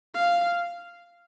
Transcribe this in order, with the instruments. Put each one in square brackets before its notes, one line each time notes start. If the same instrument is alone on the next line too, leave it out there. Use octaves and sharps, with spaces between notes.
[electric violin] F5